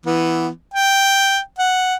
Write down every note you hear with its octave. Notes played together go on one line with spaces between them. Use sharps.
E3 B3
G5
F#5